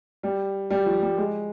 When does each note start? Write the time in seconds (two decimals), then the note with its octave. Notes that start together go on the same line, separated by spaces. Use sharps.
0.23 G3
0.70 G3
0.86 F3
1.02 G3
1.17 G#3